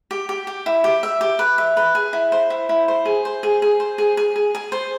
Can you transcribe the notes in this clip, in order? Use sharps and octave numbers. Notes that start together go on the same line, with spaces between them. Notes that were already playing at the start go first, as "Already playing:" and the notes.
G4
G4
G4
E4
G4
E5
G4
B4
E5
B4
G#4
E4
C5
E4
E4
C5
G#4
C5
G#4
G#4
C5
G#4
G#4
G#4
G#4
C5